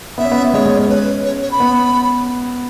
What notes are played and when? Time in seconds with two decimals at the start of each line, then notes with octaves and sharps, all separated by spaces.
0.18 B3 E5
0.25 C#4
0.32 B3
0.53 G#3 C#5
0.65 G#3
0.77 C#4 C#5
0.88 B4
1.25 C#5
1.42 C#5
1.52 B5
1.60 B3